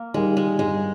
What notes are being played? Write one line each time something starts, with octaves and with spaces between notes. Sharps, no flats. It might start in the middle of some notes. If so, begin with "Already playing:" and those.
Already playing: A#3
D#3 G3 G#3
G#3
G2 G#3